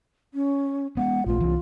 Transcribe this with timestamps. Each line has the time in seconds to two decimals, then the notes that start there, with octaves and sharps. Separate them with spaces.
0.34 C#4
0.97 G#3 B3 F#5
1.26 A#1 A3 F4
1.41 C2 E3